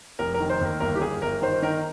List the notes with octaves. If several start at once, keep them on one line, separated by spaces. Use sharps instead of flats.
F1 A#4
A#4
D#3
C5
D#2 A#4
G1 A#4
G4
G1 G#4
G1 A#4
D#3 C5
D#3 A#4